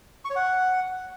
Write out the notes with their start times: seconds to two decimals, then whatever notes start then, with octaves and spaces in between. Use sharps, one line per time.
0.25 C#6
0.30 C#5
0.36 F#5